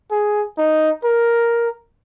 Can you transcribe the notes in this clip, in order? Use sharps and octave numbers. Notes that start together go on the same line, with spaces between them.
G#4
D#4
A#4